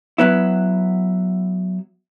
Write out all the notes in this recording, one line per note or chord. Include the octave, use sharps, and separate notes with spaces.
F#3 B3 E4